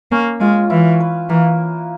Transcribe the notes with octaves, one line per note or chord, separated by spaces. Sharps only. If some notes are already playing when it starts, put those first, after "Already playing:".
A#3 C#4
G#3 F4
E3 E4
B4
E3 A#3